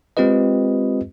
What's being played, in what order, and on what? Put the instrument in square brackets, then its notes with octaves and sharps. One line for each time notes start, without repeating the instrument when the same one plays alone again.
[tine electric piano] G#3 C4 F4 G4 B4 D#5